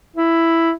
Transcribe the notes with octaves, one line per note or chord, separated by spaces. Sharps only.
E4